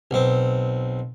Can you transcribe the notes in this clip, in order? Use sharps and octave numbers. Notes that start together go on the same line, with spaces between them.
B1 C4